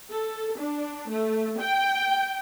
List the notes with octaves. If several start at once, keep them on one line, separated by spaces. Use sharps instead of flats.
A4
D4
A3
G5